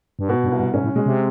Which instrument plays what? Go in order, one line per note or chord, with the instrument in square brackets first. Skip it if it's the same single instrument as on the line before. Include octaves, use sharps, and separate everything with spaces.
[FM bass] G2
[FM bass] G#2 [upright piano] B2
[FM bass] G2
[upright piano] C2
[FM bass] G2
[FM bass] G#2 [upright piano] C#4
[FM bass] A2
[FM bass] B2 [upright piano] G#3
[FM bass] C3